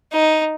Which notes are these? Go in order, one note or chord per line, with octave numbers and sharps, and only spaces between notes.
D#4